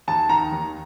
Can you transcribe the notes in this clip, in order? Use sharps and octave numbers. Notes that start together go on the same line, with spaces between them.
D#2 A5
D#3 A#5
D#2